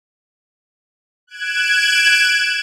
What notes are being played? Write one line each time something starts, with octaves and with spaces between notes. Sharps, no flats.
F#6 G#6 D7 E7